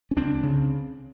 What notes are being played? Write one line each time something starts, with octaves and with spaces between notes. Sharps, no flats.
C#4
C#2 C4 D4
C#3